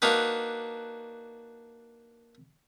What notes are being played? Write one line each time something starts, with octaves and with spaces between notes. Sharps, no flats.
A#3 D4 D#4 F#4 B4